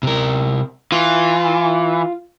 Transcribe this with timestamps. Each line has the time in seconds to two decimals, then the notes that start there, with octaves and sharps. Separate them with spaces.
0.03 C3 A#4
0.92 E3 F4